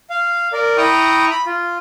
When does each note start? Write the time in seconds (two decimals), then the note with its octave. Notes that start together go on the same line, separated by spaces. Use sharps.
0.10 F5
0.53 A#4 D5
0.78 E4 G5 A#5 C#6 D#6
1.31 B5
1.46 F4